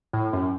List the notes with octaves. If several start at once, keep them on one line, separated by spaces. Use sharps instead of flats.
A2
F#2